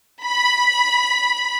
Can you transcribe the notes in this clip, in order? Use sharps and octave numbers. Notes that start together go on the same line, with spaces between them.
B5